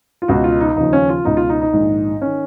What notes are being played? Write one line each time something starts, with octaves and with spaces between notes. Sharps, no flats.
F4
C#2 B2 F#4
F4
D#4
D#2 C#3 F3 D#4
C#4
F4
C#2 B2 D#4
F4
D#4
D#4
A#1 G#2 D#3
D#3 C#4